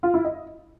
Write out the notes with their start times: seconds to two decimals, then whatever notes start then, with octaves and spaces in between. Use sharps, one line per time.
0.03 F4
0.14 E4
0.25 D#5